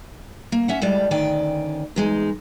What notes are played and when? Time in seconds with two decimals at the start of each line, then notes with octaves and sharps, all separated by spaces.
0.52 A#3
0.68 C#4 E5 F#5
0.82 A2 G3 G#3 D5
1.11 D2 D#3 C#4 D5 G5
1.96 E2 G#3 D#4